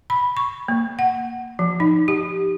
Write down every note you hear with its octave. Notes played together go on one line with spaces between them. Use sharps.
B5
C#6
A#3
F#5
F3
D#4
G4